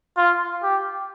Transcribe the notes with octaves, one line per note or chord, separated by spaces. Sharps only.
F4
G4